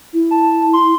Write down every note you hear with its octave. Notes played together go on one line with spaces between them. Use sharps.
E4
A5
C6